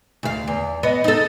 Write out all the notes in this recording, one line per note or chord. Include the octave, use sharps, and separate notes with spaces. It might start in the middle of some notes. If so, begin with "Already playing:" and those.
D2 F5
E2
B3 D#5
D#4 A4